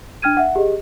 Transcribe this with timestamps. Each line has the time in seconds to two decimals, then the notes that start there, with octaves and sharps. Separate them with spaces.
0.22 D4 G5 F6 G#6 D#7
0.37 E5 F#5
0.56 G4 G#4 D#5